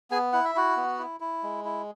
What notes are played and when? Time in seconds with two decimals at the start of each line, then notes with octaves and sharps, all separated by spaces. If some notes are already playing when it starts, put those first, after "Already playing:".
0.11 B3 G#4 G#5
0.33 E4 F#5
0.45 E5
0.55 E4 F#4 F#5
0.76 B3
0.99 E4
1.20 E4
1.43 G#3
1.65 E4